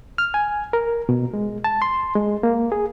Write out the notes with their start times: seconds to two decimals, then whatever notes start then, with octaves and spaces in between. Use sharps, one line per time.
0.18 F6
0.34 G#5
0.73 A#4
1.09 B2
1.34 G#3
1.64 A5
1.82 C6
2.16 G#3
2.43 A#3
2.72 G#4